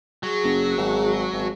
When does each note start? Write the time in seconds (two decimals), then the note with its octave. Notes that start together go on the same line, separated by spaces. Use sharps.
0.23 F#3 G#4
0.44 F#1
0.78 G#1
1.33 G#1